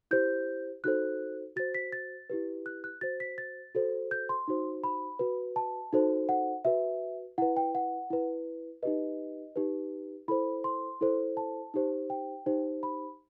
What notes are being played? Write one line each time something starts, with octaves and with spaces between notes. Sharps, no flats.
E4 G4 C5 G6
D#4 F#4 A4 C5 F#6
F#4 C5 A6
B6
A6
E4 G4 B4
F#6
F#6
F#4 C5 A6
B6
A6
F#4 A4 C5
G6
C6
D#4 F#4 C5
B5
F#4 B4
A5
D#4 F#4 A4 C5
F#5
F#4 B4 E5
E4 B4 F#5
G5
F#5
E4 B4
D#4 G4 B4 D#5
D#4 G4 B4
E4 A4 C5 B5
C6
E4 A4 C5
A5
D#4 G4 C5
G5
D#4 G4 C5
B5